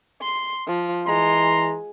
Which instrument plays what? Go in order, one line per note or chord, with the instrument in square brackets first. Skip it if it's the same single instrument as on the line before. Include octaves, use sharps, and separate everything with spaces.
[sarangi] C6
F3
[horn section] E3 A#5 C6 [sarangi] G#3